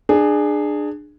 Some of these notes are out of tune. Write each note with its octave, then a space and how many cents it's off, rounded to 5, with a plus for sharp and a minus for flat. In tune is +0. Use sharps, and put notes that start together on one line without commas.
D4 +25 G#4 +0